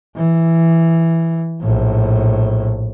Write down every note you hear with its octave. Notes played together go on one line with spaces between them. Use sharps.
E3
A#1 A2